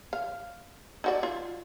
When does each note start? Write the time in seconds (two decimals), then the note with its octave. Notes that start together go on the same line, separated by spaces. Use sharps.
0.13 F5
1.04 D#4 F#4 D5
1.23 F4